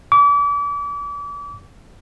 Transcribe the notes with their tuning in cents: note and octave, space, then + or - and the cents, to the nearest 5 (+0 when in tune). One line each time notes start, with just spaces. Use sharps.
D6 -35